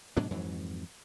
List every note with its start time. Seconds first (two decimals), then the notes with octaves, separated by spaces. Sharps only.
0.17 G#2 B2 F#3 D4
0.31 F2 G#2 E3 F#3